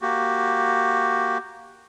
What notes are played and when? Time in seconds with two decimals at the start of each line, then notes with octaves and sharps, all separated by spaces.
0.02 A#3 F#4 G4